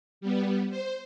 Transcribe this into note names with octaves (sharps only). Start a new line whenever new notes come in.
G3 B3
C5